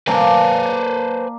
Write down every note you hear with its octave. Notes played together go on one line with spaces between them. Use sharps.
A#3 D4 B4 C5 G#5